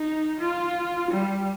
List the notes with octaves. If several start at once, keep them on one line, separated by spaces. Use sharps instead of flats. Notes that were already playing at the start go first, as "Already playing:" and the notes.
Already playing: D#4
F4
G3